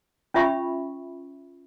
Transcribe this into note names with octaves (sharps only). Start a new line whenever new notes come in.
C#4 F4 E5 B5 C#6